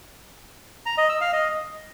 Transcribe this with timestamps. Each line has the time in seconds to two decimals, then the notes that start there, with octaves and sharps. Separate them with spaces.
0.86 A#5
0.98 D#5
1.09 E6
1.21 F5
1.33 D#5